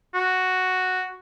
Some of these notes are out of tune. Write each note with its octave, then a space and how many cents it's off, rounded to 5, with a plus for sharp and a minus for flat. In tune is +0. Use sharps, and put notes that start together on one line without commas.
F#4 +0